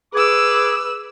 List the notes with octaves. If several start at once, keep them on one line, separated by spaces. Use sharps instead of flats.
G#4 B4 D6 E6